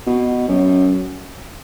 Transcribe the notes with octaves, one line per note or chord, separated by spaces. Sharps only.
B2
F#2